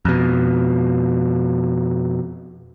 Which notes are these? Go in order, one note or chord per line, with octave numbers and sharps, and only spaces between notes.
F2 B2